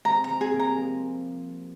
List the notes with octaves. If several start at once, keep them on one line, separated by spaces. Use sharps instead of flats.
G#3 C4 A#5
A#5
G#3 C4
G#4
G3 A#3
A#5
F3 G#3